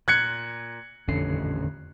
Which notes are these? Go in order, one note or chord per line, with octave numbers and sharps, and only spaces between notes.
A#2 F#6 G#6 C#7
D#1 A1 F2 D3 C#4 C7